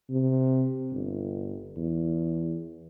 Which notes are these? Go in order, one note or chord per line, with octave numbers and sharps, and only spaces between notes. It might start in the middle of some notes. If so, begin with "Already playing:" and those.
C3
G1
E2